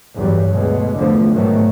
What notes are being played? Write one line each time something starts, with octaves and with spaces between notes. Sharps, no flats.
G1 E2 G2 F#3 G3
D2 B2 G#3
E2 D3 F3 A3 B3
G#2 B2 D#3 F#3 A3